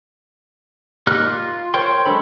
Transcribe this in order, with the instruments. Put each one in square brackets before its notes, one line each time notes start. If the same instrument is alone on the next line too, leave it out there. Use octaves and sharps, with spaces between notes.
[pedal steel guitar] A#3 D#4 G4 F6 F#6
F4
A#4 C5 C#5 G5 C6
F#3 G#3 D4 A4 B5